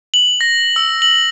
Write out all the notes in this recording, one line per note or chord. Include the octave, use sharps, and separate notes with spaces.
F#7
A#6
E6
F#7